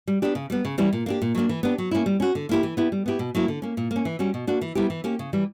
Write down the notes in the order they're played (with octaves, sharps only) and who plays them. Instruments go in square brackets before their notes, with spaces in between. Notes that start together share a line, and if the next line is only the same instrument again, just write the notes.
[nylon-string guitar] G3
B3 D4 G4
C#3
G3 B3
C#3
E3 G3 C#4 E4
A#2
A#3 D4 G4
A#2
F#3 A#3 D4
E3
B3 D4 G4
F#3
A#3 C#4 E4
G3
C#4 F#4
D3
A#3 E4 G4
E3
B3 E4 G4
G3
B3 E4 G4
B2
F#3 A#3 E4
D3
A#3 C#4
A#2
A#3
C#4
E3
G3 C#4 F#4
B2
A#3 D4 F#4
E3
G3 B3 E4 G4
E3
A#3 C#4 G4
C#3
E3 G3